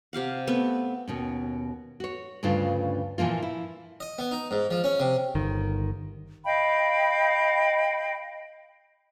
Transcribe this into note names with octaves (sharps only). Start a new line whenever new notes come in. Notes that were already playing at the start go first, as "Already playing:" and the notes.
C3 G4 F5 F#5
A3 B3 C4
D#2 B2 C#4
F#4 C#5
D2 G2 C#3 D4 F4
A#2 E3 F3 A#3 F4
E4
D#5
B3
D#4
G#2
F3
C#4
C3
G1 D#3
D#5 F5 G5 B5